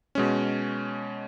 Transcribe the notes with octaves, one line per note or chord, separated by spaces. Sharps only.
B2 G#3 C#4